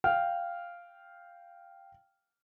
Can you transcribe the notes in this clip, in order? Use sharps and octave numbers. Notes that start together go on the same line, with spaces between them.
F5 G5 F6